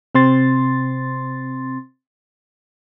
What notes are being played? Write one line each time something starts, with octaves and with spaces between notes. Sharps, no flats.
C3 C4 C6 A6